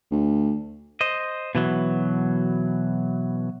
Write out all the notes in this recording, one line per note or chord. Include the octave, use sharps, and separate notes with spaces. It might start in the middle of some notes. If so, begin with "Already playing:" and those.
D2
C5 D#5
B2 E3 F#3